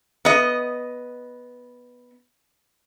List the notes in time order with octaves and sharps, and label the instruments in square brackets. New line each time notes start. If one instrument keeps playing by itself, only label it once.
[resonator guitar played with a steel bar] B3 D#5